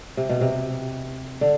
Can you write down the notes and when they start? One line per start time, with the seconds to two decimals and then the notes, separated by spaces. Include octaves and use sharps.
0.17 C3
0.29 B2
0.41 C3
1.41 D3